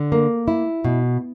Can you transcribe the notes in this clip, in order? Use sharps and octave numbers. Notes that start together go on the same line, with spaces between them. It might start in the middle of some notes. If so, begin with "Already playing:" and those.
Already playing: D3
A#3
E4
B2